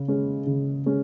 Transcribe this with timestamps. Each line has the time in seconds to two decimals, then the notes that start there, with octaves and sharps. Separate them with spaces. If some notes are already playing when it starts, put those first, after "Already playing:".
Already playing: C#3
0.08 G#3 C#4
0.47 C#3
0.86 G#3 C#4